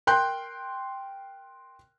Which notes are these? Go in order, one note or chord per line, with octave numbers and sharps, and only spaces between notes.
A#4 G5 C6 F#6 G6